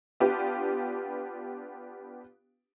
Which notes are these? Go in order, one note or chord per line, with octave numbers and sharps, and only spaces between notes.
B3 D4 F4 G4 B4